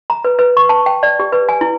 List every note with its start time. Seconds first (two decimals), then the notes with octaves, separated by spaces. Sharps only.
0.10 A#5
0.25 B4
0.39 B4
0.57 C#6
0.69 A5
0.86 G5
1.03 D5
1.19 G4
1.32 B4
1.49 G#5
1.61 E4